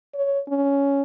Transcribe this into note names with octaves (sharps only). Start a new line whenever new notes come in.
C#5
C#4